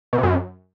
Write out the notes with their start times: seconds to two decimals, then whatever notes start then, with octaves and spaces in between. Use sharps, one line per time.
0.13 B2
0.18 C3
0.23 F#2